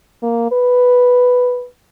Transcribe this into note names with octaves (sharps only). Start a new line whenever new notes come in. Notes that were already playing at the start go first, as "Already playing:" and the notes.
A#3
B4